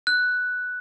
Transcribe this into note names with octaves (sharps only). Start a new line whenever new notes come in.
F#6